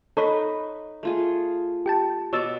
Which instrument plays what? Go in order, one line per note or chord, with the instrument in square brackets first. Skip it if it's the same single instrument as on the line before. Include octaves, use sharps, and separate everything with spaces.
[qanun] D#4 B4 [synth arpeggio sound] A4 C#5 B5
[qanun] A3 F4 G#4
[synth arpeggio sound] G4 G5 A5
[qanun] B2 D6 [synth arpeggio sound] C#5 E6 A6